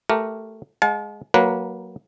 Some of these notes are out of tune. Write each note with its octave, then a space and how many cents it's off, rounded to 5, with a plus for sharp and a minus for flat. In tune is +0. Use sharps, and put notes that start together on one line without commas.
A3 +0 G4 -20 A#4 +0
G#3 +0 F5 +45 A5 -40
F#3 +0 A#3 +0 B4 -20